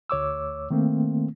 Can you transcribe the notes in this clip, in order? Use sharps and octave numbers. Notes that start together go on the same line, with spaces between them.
D2 C#5 D6 E6
D#3 A3 A#3 C4